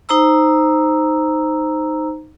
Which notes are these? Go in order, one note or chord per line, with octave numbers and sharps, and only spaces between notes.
D#4 C5 A#5 E6